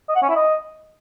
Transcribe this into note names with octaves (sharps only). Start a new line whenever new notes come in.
D#5
F#5
C#4
E4
D#5